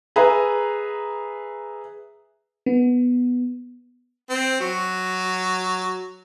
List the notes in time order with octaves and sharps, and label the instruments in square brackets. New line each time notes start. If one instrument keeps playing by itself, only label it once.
[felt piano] G#4 B4 E5 A#5
[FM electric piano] B3
[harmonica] C4
F#3